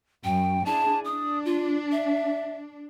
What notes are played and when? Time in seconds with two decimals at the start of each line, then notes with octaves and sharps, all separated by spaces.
0.24 F#2 G5
0.66 D4 E4 G#4 A5
1.05 D4 D#6
1.45 F4
1.92 E5